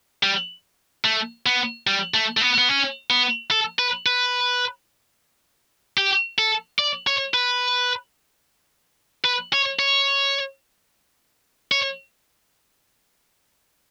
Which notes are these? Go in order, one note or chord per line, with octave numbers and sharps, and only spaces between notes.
G3
A3
B3
G3
A3
A3
B3
B3
C#4
B3
A4
B4
B4
G4
A4
D5
C#5
B4
B4
C#5
C#5
C#5